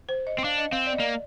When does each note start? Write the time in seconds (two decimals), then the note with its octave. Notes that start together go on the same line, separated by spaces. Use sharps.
0.09 C5
0.27 D#5
0.38 C4
0.44 D4 F5
0.58 D#5
0.72 C4 F5
0.86 D5
0.94 D#5
1.00 A#3 D5